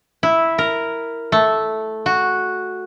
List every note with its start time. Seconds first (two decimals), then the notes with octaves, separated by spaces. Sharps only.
0.23 E4
0.58 A#4
1.32 A3
2.06 F#4